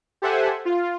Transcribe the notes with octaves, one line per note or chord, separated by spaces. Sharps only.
G4 A4 C5 E5 F#5 G#5
F4